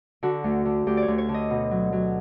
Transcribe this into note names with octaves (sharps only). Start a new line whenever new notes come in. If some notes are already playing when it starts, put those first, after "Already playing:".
D3 F#4
D2
D3
D2 G4
D5
C#5
D2
C#5
D3
D#5
B2
F#3
F#3